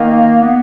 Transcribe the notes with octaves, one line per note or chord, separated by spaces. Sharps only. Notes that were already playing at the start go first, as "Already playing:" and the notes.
Already playing: D#3 A#3
B3